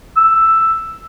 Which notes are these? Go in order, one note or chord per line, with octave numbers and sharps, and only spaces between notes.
E6